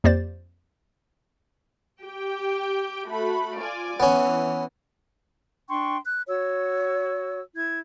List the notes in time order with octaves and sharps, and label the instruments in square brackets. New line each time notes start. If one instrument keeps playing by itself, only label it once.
[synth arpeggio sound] F2 A#3 G4 C5 D5 A6
[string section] G4 G5
A3 F#4 B5
F4 D5 G#5
[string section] E3 [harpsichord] B3 C#4
[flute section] D4 G5 C6 C#6
F#6
F#4 C#5 E6
E4 G#6